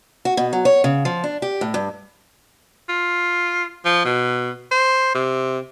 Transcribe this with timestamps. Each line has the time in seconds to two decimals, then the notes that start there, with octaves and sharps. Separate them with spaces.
0.25 F#4
0.37 B2
0.53 F#3
0.65 C#5
0.84 C#3
1.05 F3
1.24 D4
1.42 G4
1.61 A2
1.74 G2
2.89 F4
3.85 F3
4.05 B2
4.72 C5
5.15 C3